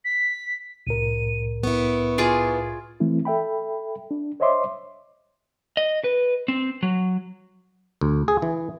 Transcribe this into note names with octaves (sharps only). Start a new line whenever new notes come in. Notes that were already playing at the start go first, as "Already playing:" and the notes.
B6
C2 A2 A#4 D#7
B3 E4 C#6
F4 G#4 D5
E3 A3 C4 E4
A4 E5 G5 B5
D4
C5 C#5 D#5 E5 C6 D6
D#5
B4
C4
F#3
D2
G#4
E3